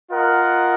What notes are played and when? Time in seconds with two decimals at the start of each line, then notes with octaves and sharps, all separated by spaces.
0.11 F4 A#4 D#5 F#5